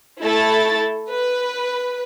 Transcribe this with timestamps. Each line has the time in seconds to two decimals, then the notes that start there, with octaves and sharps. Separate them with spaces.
0.22 A3 E4 A4 A6
1.11 B4